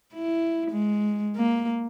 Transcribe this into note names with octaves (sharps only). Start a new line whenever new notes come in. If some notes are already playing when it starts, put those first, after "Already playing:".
E4
G#3
A#3